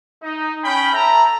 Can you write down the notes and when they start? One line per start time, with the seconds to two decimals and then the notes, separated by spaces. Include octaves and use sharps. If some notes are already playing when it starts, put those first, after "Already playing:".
0.23 D#4
0.64 C#4 G5 B5
0.93 A4 E5 A#5